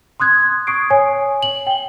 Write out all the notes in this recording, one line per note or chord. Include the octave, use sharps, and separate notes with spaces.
C6 D#6 F#6 G#6
C#6 D#6 G#6 C7 D7
C#5 G#5
F#7
G5 G7